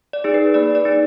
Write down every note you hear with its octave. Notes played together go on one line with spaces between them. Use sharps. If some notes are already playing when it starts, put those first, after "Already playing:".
D5
D#4 G#4
B4
A#3 D5
D5
D#4 G#4